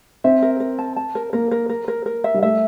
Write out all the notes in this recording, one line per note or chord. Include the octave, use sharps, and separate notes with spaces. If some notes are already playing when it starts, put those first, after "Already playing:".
C4 E5
A#4
A#4
A5
A5
A#4
A#3 A#4
A#4
A#4
A#4
A#4
E5
G3
A3 E5